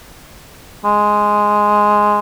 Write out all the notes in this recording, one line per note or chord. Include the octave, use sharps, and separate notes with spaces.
G#3